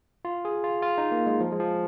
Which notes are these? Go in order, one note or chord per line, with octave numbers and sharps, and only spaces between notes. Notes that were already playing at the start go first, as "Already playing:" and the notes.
F4
G#4
F4
F4
D#4
A#3
G#3
F3
G#3
F3